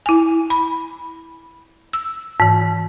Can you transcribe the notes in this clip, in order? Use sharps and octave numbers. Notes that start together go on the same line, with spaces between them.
E4 G#5
B5
E6
G#2 E3